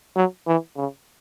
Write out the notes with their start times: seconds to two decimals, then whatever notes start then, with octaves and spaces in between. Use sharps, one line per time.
0.16 F#3
0.47 E3
0.77 C#3